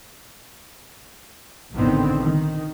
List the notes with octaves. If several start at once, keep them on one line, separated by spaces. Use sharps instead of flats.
A#1 A2 D3 D#3 B3 C4
D#3